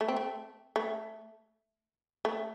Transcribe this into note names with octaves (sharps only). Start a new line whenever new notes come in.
A3
C4
A3
A3
A3